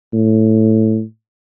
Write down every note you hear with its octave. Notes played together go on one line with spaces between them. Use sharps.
A2